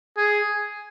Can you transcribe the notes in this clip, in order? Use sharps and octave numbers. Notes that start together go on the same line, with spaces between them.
G#4